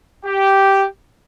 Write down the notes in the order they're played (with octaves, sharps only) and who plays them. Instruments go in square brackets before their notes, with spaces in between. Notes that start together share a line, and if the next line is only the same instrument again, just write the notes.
[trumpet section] G4